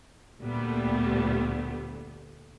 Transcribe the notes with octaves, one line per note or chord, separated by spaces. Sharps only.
D2 A#2 G3 A3 B3